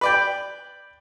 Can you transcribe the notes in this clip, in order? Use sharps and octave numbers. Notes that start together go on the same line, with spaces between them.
B4 D5 G5